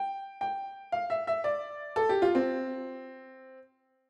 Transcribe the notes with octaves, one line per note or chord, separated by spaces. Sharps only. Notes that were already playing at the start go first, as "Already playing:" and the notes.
Already playing: G5
G5
F5
E5
E5
D5
A4
G4
F4
C4